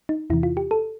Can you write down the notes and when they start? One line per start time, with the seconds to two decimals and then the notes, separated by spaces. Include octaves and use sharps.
0.09 D#4
0.30 E2 C3 E3 E4
0.43 F4
0.57 G4
0.71 A4